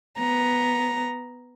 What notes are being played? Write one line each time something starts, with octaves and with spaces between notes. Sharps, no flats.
B3 A#5